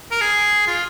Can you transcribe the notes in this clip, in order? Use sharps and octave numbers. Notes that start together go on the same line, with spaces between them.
A#4
G#4
F4